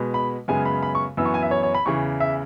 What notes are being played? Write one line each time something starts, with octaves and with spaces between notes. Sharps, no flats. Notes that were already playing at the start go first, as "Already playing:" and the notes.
Already playing: B2 G#3 B3
B5
F#2 C#3 G#3 B3 G#5
B5
B5
C#6
F#2 E3 B3 E6
C#6
G#5
E5
C#5
C#5
B5
E2 C#3 E3 C#6
E5